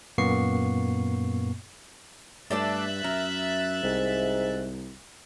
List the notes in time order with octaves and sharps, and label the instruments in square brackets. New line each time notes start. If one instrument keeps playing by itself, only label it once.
[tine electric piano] F#2 A#2 A#3 B3 C#6 C7
[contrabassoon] G2 [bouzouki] A3 D4 A4 [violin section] E5 F#6 A6
[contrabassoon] F#2 [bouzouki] A#4
[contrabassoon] C2 [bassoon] G#2